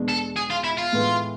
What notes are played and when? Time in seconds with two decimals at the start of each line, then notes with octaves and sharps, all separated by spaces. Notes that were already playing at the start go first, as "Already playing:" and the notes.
Already playing: E2 B2 G#3 D4
0.09 A4
0.37 G#4
0.51 F4
0.64 E4
0.78 F4
0.92 A2 E3 G#3 B3